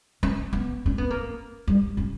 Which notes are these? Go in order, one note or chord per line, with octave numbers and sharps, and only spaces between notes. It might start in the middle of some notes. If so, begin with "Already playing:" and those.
C#4
B3
C#4
B3
A#3
G3
C#4